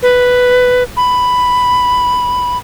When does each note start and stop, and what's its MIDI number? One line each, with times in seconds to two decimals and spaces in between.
0.02 0.83 71
0.97 2.57 83